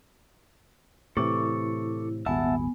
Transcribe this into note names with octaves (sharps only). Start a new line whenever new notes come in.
A2 C3 E3 E4 A4 C#6 D6
D#1 G#1 B3 E5 F#5 G#5 A5